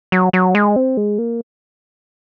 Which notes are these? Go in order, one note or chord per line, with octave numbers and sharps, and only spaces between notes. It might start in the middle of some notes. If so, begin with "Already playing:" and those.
F#3
F#3
G#3
C4
G#3
A#3